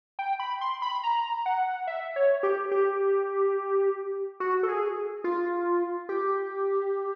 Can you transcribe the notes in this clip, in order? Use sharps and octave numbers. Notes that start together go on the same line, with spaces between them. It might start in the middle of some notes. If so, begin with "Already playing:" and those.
G5
B5
C6
B5
A#5
F#5
E5
C#5
G4
G4
F#4
A4
G#4
F4
G4